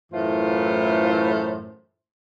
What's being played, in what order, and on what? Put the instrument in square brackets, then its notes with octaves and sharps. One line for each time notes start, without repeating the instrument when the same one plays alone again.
[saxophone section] F#2 A2 E3 A3 F4 C5